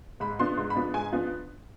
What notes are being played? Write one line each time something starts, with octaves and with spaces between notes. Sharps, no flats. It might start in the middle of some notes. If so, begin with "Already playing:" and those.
G#2 B5
F3 B3 D4 C6
G#2 C6
B5
F3 B3 D4
G#2 G#5
F3 B3 D4